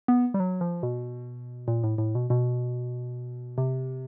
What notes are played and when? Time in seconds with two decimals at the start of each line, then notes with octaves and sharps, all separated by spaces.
0.08 B3
0.34 G3
0.40 F#3
0.61 F3
0.83 B2
1.68 A#2
1.84 A2
1.98 A2
2.15 B2
2.30 B2
3.58 C3